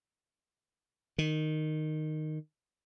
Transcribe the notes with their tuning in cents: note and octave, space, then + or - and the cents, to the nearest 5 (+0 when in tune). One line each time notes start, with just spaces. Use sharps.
D#3 -10